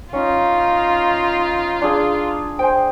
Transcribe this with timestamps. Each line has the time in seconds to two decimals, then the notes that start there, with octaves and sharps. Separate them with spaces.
0.13 C#4 D#4 F4
1.82 D4 G#4
2.59 C5 G5 G#5